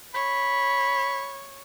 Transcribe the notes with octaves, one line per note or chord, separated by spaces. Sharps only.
C#5 B5